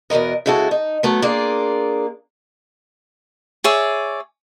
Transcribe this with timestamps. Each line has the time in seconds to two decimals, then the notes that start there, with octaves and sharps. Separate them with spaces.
0.10 E2 B2 G#3 A#4 D#5
0.46 C#3 G#3 E4 F#4 A4
0.71 D#4
1.03 F#3 A3 B3
1.22 A#3 D4 F4 G#4
3.64 G#4 C#5 D5 E5